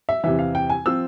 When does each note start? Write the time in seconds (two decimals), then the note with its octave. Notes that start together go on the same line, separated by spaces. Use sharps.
0.09 E5
0.24 E2 C3 E3 E5
0.39 F5
0.55 G5
0.70 G#5
0.86 F3 C4 F4 E6